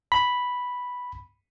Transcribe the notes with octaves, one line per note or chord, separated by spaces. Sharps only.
B5